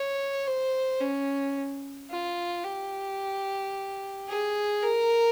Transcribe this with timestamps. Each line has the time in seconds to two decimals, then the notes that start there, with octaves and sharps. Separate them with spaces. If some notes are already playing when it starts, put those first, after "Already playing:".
Already playing: C#5
0.47 C5
1.01 C#4
2.11 F4
2.65 G4
4.28 G#4
4.83 A#4